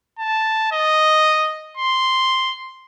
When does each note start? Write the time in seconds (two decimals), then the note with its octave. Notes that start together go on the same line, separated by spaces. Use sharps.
0.19 A5
0.72 D#5
1.77 C6